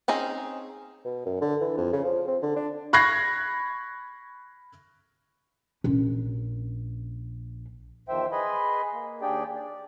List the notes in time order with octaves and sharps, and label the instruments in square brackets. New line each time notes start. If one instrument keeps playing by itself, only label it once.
[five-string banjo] C4 C#4 D#4 G#4
[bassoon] B2
F#2
D3
E3
F2
C#3
F3
C4
D3
D4
[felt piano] B5 C#6 F#6 G#6 A#6 C7
[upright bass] A#1 C#4
[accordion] E2 D#3 F3 C5 E5 G5
G#4 B4 D#5 G#5 B5 C6
A#3
D#2 D4 G4 G#4 D5 G5
D5